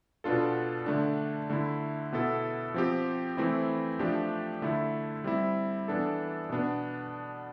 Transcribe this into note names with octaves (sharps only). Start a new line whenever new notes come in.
B2 B3 D4 F4 A4
D3 A3 D4
D3 A3 E4
B2 B3 E4 A4
F3 C4 G4
E3 A3 C4 E4
F3 A3 D4 G4
D3 A3 E4 A4
G3 C4 E4
E3 B3 D4 A4
B2 B3 D4